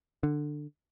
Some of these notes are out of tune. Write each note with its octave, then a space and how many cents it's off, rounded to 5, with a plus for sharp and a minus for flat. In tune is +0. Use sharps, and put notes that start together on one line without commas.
D3 +15